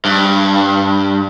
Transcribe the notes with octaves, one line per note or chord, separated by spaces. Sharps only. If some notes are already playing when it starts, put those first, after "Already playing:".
G2